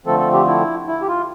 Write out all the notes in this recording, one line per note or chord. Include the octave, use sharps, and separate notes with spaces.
D3 F3 A3 C4 A4
A4
G4
E4
E4
G4
F4